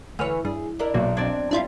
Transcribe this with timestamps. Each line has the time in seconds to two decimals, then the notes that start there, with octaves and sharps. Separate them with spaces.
0.19 D2 E3 B4 C#5 F6
0.45 G2 G#4
0.79 D4 E4 A#4
0.94 B1 A#2 F#3
1.17 C4 D4 D5 G#6
1.51 G#2 G3 D4 E4 F4